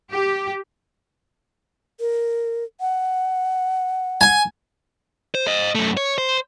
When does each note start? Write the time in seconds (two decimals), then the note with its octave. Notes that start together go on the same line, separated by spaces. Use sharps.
0.11 G4
2.00 A#4
2.80 F#5
4.21 G#5
5.35 C5
5.47 C5 D#5
5.75 F#2 A3
5.97 C#5
6.18 C5